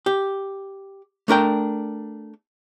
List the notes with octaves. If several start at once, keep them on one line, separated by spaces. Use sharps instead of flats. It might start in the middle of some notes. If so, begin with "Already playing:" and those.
G4
A3 D4 A#4 G5